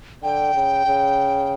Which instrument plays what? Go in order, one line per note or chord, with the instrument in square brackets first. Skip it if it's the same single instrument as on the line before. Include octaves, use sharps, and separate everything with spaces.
[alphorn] D3 [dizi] G5
[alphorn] C#3
C#3